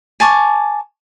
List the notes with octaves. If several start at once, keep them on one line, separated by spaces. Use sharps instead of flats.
G#5 A5 C#6 D6